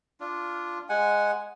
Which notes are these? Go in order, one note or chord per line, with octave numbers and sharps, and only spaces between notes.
D4 F4
G#3 F#5 G#5